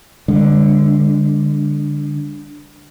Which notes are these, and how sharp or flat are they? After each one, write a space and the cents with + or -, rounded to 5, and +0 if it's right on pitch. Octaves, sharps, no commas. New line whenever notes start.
D3 +0 G#3 -45